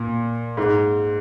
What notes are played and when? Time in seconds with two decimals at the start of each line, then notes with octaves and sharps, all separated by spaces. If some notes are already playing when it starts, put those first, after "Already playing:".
Already playing: A#2
0.57 G#2